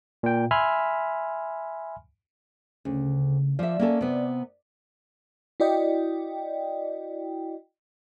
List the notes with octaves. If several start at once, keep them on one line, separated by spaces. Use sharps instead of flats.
A#2 G5
E5 G#5 B5 C6 F6
D2 C#3
F3 D5 E5
A#3 C#4 A4
C3 B3
E4 F#4 D5 D#5 G5